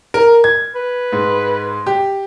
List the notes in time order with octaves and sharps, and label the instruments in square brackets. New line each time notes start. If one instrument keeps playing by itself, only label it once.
[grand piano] A#4
G#6
[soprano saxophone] B4
[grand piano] G#2
G4